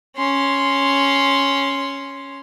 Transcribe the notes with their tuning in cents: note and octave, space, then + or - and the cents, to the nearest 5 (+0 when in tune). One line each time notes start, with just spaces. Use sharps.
C#4 +0 C6 +0